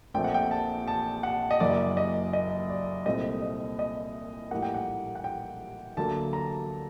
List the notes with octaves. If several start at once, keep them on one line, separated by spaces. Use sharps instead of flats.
A#1 A#2 A3 C4 G5
F#5
G5
A5
A5
F#5
D#5
F#1 F#2 F#3 A#3 D5
D#5
D#5
D5
C2 A#2 A3 C4 D#5
D#5
D#5
A#1 A2 G3 A#3 F#5
G5
F#5
F#5
G5
D2 D3 F#3 A#3 A5
A#5